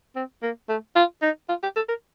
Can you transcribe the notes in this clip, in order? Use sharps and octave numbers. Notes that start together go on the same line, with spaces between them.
C4
A#3
A3
F4
D#4
F4
G4
A4
A#4